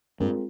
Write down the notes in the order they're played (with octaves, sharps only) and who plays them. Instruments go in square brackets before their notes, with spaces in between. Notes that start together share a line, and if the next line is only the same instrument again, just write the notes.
[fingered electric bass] G2 G3 [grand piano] G#3 C4 F4 A#4